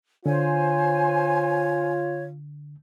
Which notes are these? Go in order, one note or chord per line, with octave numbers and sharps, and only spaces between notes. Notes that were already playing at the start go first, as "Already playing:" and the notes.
D3 F4 C5 C#5 G#5